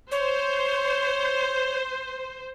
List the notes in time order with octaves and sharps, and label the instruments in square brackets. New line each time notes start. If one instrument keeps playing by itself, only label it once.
[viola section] C5 [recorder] C#5